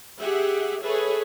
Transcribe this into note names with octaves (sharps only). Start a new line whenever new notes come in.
G4 G#4 E5 F#5
G#4 A4 B4 C#5 E5